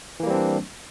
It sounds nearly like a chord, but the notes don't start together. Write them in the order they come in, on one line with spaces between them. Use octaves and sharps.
E3 A#3 G3 C4 D4